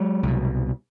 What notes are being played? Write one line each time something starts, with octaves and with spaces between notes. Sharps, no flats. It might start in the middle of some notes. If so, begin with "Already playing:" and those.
Already playing: F#3 G#3
C2 B2